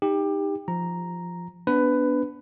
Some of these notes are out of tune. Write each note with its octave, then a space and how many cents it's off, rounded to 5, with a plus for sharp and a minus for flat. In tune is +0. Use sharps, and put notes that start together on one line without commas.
D#4 +0 G4 +20
F3 +0 A#5 +0
B3 +0 D4 -15 B4 +15